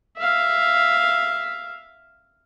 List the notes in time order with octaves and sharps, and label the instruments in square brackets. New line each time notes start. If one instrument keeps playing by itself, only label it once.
[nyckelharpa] E5 F5